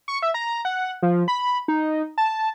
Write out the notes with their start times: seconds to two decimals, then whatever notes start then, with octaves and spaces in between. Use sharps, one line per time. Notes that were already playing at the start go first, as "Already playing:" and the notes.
0.08 C#6
0.22 E5
0.34 A#5
0.65 F#5
1.03 F3
1.28 B5
1.68 D#4
2.18 A5